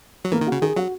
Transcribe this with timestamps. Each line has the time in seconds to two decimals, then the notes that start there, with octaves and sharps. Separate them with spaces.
0.25 F#3
0.32 E3 A#3
0.41 D#3
0.46 F#4
0.52 C#3
0.62 D#3 G#4
0.76 F#3 F#4